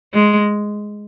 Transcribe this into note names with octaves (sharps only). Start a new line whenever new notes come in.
G#3